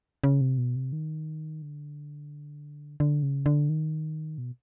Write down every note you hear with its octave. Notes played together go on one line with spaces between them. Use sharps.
C#3
C3
B2
C3
D#3
D3
D3
C#3
D3
D#3
B2